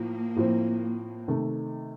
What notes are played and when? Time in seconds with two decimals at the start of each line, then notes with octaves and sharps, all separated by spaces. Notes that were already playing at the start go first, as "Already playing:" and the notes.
Already playing: A2 F3 A#3
0.36 A2 F3 C4
1.28 C3 D#3 A3